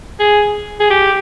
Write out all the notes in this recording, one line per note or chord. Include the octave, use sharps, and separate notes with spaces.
G#4
G#4
G4